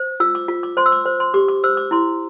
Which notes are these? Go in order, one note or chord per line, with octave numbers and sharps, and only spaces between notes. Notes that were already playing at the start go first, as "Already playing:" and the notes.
Already playing: C5
F4 E6
D6
F4
D6
C5 C6
E6
D6
C5
C6
G4 D6
D6
C5 E6
D6
E4 C6